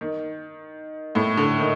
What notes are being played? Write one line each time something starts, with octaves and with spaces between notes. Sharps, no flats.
D#3
A2
D3
D#3